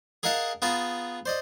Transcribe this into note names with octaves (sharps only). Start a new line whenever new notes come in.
G#4 A#4 D#5 F5 F#5 A5
B3 F4 G#4 A5 A#5
C5 D5 D#5